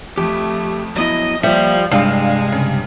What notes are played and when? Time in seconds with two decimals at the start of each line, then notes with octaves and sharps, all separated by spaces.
0.18 F2 A3 G4
0.96 F#3 B3 E4 D#5
1.43 F3 G3 A#3 F4 E5
1.91 G2 C3 G3 G#3 D4 F5 C7
2.52 C#3